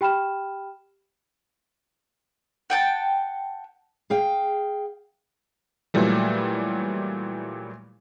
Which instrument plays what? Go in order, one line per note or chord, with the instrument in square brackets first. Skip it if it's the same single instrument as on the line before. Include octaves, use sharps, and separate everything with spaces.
[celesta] G4 G5 B5 F6 E7
[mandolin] F#5 G5 A5
[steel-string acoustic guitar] G#4 F5 G5
[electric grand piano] A#2 E3 F#3 G3 A3